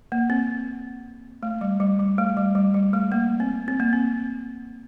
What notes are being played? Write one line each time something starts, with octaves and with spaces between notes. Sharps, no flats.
A#3
C4
A3
G3
G3
G3
A3
G3
G3
G3
A3
A#3
C4
C4
A#3
C4